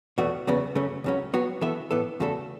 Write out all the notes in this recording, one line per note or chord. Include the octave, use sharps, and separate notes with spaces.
E2 B2 A3 F#4
E2 C#3 F#3 B3 F#4
F#2 C#3 A3 C#4
C#2 C#3 F#3 C#4 F#4
F#3 B3 F#4 C#5
E3 B3 A4 E5
A2 E3 B3 A4
E2 C#3 A3 F#4 A4